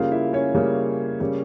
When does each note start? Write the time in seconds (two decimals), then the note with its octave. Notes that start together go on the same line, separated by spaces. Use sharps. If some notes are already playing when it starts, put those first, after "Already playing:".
Already playing: C#3 G3 A#3 F4 F5
0.11 E4 E5
0.33 C#4 C#5
0.55 C#3 G3 A#3
1.20 C#3 G3 A#3